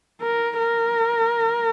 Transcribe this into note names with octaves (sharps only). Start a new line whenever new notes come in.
A#4
A#4